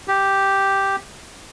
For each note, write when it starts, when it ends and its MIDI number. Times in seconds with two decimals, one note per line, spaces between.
0.08 0.96 67